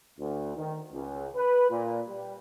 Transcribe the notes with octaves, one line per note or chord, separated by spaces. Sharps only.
D2
D#3
C#2
B4
A#2
G3